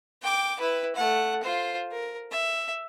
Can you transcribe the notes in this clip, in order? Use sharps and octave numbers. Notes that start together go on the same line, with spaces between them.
G5 D6
E4 B4
A3 F#5
F4 C5
A#4
E5